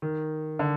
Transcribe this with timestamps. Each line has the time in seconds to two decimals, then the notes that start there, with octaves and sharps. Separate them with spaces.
0.02 D#3
0.59 D3